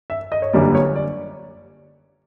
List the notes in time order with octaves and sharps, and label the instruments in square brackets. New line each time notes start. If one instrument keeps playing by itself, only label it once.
[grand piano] E5
D#5
C#5
G1 F#2 D3 G3 A#3 D5
C#5
D5